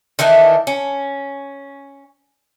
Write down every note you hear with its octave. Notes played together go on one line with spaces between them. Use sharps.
D#3 E3 D4 E4
C#4